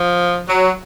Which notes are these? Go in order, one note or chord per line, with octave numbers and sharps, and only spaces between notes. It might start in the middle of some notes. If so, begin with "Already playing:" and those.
Already playing: F3
F#3